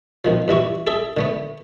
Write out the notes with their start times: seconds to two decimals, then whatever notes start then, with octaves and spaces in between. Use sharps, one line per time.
0.25 B2 D#3 F3
0.48 G2 E3 E4 F#4
0.87 G#4 A4 E5
1.17 D3 A3 B3